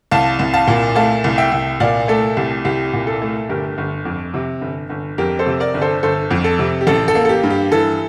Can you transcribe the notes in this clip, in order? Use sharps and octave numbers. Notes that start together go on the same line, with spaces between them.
C2 F5 A5
C2
F5 A5
A#2
A3 F5 A5
C2
E5 G5
C2
A#2 D5 F5
A3 A4
C2 G4
C2 G4
A#2
A4
A3
G1 G4 A#4
G1
F2
C3
G1
G1
F2 G4 A#4
A4 C5
C3
A#4 D5
G1
A4 C5
G1 A4 C5
F2
A4
C3
G4
A1 A4
A4
A#3
A4
G4
G2
G4
E3 A4